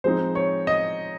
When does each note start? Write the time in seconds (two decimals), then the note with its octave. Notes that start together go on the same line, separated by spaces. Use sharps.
0.04 F3 G#3 C4 D#4 C5
0.35 C#5
0.67 D#5